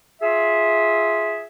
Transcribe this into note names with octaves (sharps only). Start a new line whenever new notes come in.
F4 G#4 E5